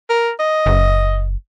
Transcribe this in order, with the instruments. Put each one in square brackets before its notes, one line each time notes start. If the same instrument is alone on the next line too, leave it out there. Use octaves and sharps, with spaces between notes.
[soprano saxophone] A#4
D#5
[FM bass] F#1